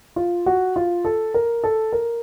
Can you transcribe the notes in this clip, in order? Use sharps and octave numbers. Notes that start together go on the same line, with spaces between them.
F4
F#4
F4
A4
A#4
A4
A#4